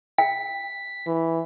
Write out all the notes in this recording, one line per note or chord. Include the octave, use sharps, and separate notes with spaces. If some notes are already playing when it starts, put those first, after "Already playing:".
G5 B6
E3